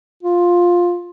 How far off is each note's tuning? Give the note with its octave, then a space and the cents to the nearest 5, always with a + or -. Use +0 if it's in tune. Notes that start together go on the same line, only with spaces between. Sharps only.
F4 +10